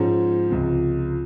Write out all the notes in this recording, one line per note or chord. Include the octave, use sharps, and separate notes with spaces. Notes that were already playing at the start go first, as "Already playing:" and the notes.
Already playing: G#2 F3 G#3 C#4
C#2 C3 F3